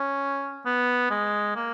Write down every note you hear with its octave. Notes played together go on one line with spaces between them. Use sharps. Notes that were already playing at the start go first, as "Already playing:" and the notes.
Already playing: C#4
B3
G#3
A#3